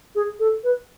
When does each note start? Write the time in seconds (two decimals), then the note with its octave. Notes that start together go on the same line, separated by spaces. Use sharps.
0.15 G#4
0.39 A4
0.64 B4